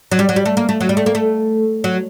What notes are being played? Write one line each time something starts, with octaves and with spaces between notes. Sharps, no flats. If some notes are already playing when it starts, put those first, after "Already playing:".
F#3
G3
F#3
G3
A3
A#3
A3
F#3
G3
A3
A#3
A3
F#3